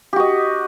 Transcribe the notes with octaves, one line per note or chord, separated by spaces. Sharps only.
F#4 G4 D#5